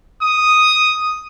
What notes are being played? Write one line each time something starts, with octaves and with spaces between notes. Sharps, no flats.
D#6